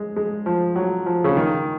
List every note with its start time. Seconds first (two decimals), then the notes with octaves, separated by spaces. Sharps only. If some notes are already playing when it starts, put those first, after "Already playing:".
Already playing: G#3
0.16 G#3
0.46 F3
0.76 F#3
1.06 F3
1.24 C#3
1.37 D#3